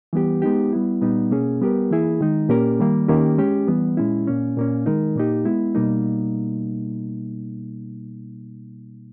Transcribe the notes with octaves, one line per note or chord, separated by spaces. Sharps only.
E3 G3 B3 G4
G#3 B3 D#4 G4
G3 B3 E4
A#2 G3 B3 D#4
B2 A#3 C#4 G#4
G3 B3 G4 A#4
E3 A#3 E4 G#4
D#3 G#3 D#4
A#2 A#3 C#4 G4 A#4
D#3 G3 A#3
D#3 A#3 C#4 G4
G#3 C#4 G4
E3 G3 B3
A#2 G#3 C#4 E4
A#2 A#3 C#4
A#2 A#3 C#4
D#3 G#3 D#4 A#4
A#2 A#3 D#4 G4
G#3 B3 E4
B2 G3 A#3 D#4